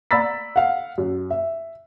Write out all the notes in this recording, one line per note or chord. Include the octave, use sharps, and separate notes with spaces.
D5 A#5 B5 E6 A6 B6
F5 F#5
F#2
E5